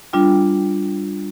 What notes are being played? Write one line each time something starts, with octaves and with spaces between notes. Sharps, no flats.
G3 D4 F4 G5